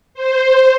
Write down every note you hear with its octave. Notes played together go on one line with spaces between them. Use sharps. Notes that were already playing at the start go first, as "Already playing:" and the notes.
C5